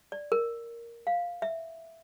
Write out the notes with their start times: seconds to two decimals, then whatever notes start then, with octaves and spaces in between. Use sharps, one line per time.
0.12 D5
0.32 A#4
1.07 F5
1.42 E5